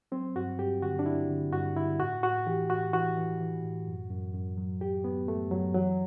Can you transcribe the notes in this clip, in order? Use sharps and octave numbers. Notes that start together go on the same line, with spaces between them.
F#3 C4
G2 F#4
G2 G4
D3 F#4
D4
D3 E4
D3
G2 F#4
D3 E4
A2 F#4
A2 F#4
E3 G4
A2 F#4
E3 F#4
E3
E3
A2
F#2
F#2
F#2
F#3
F#2 G4
F#3 B3
F#2 A3
F#2 F#3
E3 F#3